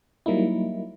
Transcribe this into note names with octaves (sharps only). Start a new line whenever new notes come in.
F#3 G3 A#3 D#4 E4